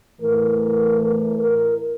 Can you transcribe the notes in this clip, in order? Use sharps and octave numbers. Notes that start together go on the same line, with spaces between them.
A2 E3 A3 A#4
A#4
A#4